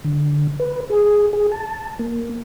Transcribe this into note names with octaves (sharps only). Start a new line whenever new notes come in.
D3
B4
G#4
G#4
A5
A#3